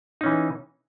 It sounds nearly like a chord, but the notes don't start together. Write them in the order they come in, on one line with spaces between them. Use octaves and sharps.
D#4 C#4 E3